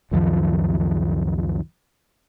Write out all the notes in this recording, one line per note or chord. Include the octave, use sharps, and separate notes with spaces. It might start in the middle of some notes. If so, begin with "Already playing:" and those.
C#2 F#2 D#3 F3